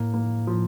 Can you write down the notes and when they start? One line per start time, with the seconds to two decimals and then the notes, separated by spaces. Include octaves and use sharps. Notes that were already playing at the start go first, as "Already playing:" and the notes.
Already playing: A2 A#3
0.14 A#3
0.47 F3